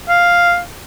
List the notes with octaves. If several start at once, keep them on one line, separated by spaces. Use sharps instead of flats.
F5